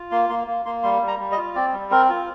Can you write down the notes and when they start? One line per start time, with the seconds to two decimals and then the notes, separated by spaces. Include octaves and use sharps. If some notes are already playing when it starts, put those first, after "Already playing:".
Already playing: F4
0.11 A#3 C6
0.29 A#3 C6
0.47 A#3
0.65 A#3 C6
0.83 G3 C6
1.02 G3
1.08 A#5
1.19 G3
1.32 D#5
1.37 F4
1.55 C4 D5
1.73 G3
1.91 C4 A#4
2.09 F4